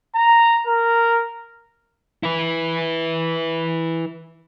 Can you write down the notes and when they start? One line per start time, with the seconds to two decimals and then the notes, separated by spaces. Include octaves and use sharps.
0.15 A#5
0.67 A#4
2.23 E4 B4